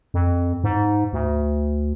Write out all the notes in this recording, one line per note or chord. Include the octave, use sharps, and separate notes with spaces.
F2
G#2
D2